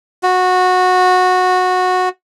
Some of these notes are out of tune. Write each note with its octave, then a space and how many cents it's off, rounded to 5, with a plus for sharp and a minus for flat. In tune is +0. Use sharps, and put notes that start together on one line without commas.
F#4 -15